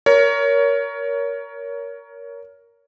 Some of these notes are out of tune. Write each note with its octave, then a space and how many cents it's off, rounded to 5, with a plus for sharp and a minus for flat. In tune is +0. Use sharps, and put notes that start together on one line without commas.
A#4 +5 C#5 +20